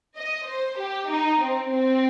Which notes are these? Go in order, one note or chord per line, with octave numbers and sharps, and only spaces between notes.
D#5
C5
G4
D#4
C4
C4